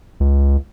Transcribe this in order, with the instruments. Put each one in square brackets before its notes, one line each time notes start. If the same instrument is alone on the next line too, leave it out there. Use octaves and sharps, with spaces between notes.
[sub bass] C#2